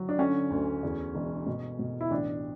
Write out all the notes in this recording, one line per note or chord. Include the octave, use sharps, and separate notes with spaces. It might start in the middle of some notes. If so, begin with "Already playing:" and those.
Already playing: F#3
D4
D3 C#4
D2
E2
E1
B2
B2
E4
A1 D4